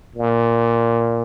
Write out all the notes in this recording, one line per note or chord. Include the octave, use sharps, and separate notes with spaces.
A#2